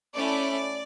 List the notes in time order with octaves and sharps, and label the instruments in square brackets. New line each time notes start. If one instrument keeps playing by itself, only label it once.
[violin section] A3 C#4 E4 D5